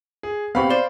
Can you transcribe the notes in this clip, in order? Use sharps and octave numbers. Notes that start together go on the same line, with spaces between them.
G#4
B3 C4 G4 F5 B5 C#6
C5 D5